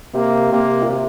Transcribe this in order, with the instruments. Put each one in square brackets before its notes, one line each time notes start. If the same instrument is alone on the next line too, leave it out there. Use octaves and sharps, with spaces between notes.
[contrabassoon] C3 [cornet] A#3
[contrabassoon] C3 [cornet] A#3
[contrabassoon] A#2
C3